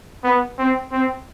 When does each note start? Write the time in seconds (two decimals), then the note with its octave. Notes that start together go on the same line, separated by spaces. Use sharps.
0.24 B3
0.59 C4
0.92 C4